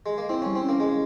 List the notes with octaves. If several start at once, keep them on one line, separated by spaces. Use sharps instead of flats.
G#3
A#3
C4 E4
G3 C#4
C4
C#4
A#3
G#3